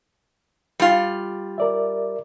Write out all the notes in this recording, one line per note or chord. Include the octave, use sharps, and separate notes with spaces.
G3 F4
A#4 D5 E5